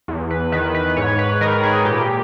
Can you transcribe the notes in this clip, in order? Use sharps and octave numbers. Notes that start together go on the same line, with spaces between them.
E2
B4
D#3 B4
B4
G#2 C#5
B4
D#3 A#4
G#4
A#2 G4